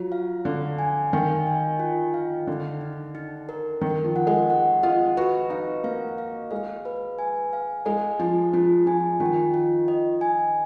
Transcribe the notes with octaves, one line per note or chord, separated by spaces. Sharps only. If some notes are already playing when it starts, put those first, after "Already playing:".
Already playing: F#3 F4
F5
D3 F5
G#5
D#3 F5
G#5
F4
F5
D3 D#4
D#4
D#4
A#4
D#3 A#4
F3
F#5
G#3
F#5
F4 D#5
F#4 B4
D#4 F5
A#3 F5
F5
G#3 F5
B4
G#5
F5
G#3 G#5
F3 G#4
F3 F4
F3 G#5
D#3 F4
F4
D#5
G#5